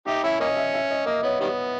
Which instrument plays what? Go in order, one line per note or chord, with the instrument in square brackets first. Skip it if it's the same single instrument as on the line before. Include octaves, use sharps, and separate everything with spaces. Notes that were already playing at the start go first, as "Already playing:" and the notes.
[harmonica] D#4 G4 [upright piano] E5
[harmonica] C#4 E4 [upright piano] E5
[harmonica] A#3 C#4 [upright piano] D#5
[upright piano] E5
E5
D#5
[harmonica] A#3 [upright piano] D#5
[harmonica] B3 [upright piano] C#5
[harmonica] D#3 G3 B3